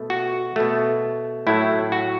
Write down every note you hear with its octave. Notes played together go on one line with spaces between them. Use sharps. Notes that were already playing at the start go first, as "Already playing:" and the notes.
Already playing: B2 A3
F#4
B2 A3
A2 F#3 A3 E4
F#4